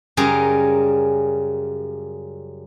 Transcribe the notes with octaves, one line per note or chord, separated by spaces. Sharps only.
F#2 C#3 G3 G#4 A#4 A#5